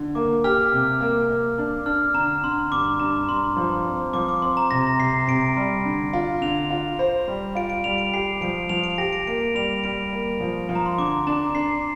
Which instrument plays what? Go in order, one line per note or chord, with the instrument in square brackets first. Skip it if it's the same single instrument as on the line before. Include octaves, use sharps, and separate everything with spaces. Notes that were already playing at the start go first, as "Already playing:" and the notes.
Already playing: [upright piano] D3
[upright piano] A#3 [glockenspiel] D6
[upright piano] G4 [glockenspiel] F6
[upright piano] C3
A#3
A#3
D4
[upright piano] D4 [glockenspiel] F6
[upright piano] D3 [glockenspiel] A#5
[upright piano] D3 [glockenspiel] C6
[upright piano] G2 [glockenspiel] D6
[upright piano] G2 [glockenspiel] A#5
[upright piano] G2 [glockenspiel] C6
[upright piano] F3
C4
[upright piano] F3 [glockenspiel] D6
[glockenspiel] D6
[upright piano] C4 [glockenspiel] C6
[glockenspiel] A#5
[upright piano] C3 [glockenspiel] A#6
[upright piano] C3 [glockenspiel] C7
[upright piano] C3 [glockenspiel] D7
[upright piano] G3
D3
F4
[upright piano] D3 [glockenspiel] F7
[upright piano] F4
C5
G3
[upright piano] F4 [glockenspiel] D7
[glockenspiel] D7
[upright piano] G3 [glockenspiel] F7
[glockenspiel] D7
[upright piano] G4 [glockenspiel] C7
[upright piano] F3 [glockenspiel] D7
[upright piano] F3 [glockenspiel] F7
[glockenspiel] D7
[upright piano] G4 [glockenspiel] A#6
[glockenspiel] D7
[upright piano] A#3 [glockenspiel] D7
[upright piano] G3 [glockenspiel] F7
[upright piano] G3 [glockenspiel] D7
[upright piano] A#3
F3
F3
[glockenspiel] A#5
C6
[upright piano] D3 [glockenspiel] D6
[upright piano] D4 [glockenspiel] A#5
[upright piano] D4 [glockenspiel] C7